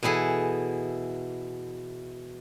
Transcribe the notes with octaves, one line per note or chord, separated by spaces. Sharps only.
B2 E3 E4 G#4 A4